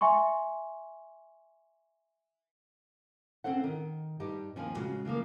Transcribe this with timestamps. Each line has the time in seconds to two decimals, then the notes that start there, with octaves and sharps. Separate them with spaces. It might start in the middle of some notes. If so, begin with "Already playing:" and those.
0.01 E5 G#5 C6 C#6
3.44 C4 C#4 A4 C5 F#5
3.64 D#3
4.20 G2 D#4 G4
4.56 D#2 D#3 F3 F4 G#5
4.76 C#3 G#3 F#4
5.05 C#3 E3 F3 A#3